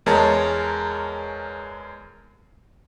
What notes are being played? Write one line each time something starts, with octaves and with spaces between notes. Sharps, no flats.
E2 G#3 A#4 C#5 A5